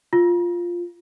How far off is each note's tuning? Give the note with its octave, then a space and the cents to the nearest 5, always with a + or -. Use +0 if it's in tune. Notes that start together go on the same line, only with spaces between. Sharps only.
F4 +0